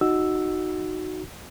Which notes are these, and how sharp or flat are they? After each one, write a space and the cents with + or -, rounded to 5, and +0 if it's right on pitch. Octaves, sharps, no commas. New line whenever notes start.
D#4 +0 F#4 +0 E6 +0